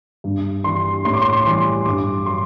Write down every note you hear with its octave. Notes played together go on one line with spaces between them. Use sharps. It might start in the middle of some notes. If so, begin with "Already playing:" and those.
G2
E3 G3 C6
A2 C6
D6
C6
E3 G3 C6
G2 D6
F#3 C6